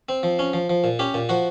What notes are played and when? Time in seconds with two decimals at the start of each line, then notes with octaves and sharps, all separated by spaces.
0.09 C4
0.23 F3
0.39 C#4
0.53 F3
0.70 F3
0.84 A#2
0.99 C#4 G4
1.14 A#2
1.29 F3 F#4